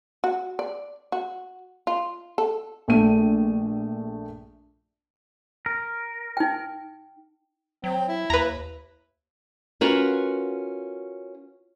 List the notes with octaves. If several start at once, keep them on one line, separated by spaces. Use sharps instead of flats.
F#4
D5
F#4
F4
A4
A#1 A3 D#7
A#4
D#4 G5
F#3 C4
E4
D#2 B4 A#5
C#4 F4 F#4 A#4 B4